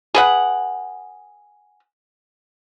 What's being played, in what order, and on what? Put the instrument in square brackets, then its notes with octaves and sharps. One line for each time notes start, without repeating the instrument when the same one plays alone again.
[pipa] G#4 B4 F#5